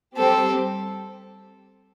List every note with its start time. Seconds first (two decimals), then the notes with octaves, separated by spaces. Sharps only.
0.17 G3 C4 G4 A4 C5